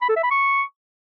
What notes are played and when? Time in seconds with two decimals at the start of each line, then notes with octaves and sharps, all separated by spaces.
0.02 B5
0.09 A4
0.16 E5
0.23 B5
0.31 C#6